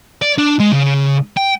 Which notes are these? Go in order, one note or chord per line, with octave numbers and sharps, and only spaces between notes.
D5
D4
G#3
C#3
G5